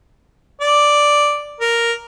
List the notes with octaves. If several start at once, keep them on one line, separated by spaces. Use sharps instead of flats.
D5
A#4